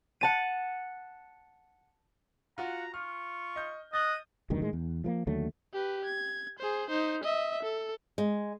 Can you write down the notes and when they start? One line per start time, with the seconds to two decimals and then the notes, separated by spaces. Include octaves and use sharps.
0.21 F#5 A5 D#7
2.58 F4 F#4 F#5 A#5
2.94 F4 C#6 F6
3.56 D#5 G6
3.93 D#5 D#6 F#6 A6 G7
4.50 F1 D2 G2 D#3
4.62 A2 D#3 G#3
4.73 E2
5.04 F3 A3 A#3
5.27 D#2 D3 F#3 A3
5.73 G4 B4
6.05 G#6
6.59 G#4 C5
6.90 D#4 C5
7.24 D#5 E5
7.63 A4
8.18 G#3